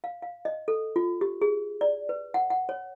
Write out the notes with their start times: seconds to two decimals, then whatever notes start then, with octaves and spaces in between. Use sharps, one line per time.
0.04 F5
0.22 F5
0.45 D#5
0.68 A4
0.96 F4
1.21 G4
1.42 G#4
1.81 D5
2.09 B4
2.34 F#5
2.50 F#5
2.69 C#5